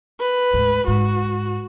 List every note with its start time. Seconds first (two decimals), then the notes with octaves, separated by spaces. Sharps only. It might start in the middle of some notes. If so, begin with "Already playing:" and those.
0.20 B4
0.53 D2 G#2
0.88 G#2 F#4